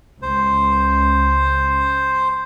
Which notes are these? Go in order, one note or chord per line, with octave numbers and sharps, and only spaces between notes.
C#2 C5